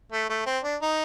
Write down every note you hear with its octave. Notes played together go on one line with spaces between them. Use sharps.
A3
A3
C4
D4
D#4